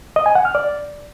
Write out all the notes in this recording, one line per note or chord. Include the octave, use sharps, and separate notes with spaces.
D#5
G#5
F#5
F6
D5